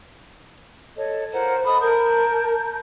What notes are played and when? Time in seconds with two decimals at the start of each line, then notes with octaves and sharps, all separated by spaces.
0.96 A4 C#5 D#5
1.33 F4 A#4 C5 F#5
1.66 A4 D#5 B5 D#6
1.81 A#4 A5 A#5 G6